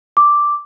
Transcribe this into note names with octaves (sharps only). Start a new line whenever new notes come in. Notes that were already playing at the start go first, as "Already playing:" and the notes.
D6